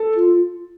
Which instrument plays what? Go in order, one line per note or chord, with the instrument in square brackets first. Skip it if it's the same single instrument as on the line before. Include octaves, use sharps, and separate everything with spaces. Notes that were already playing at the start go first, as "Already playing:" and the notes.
Already playing: [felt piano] A4
[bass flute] F4